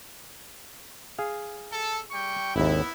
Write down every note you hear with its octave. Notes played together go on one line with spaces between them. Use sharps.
G#4 F5
A4
G3 G5 C#6
G#1 D#2 B3 E4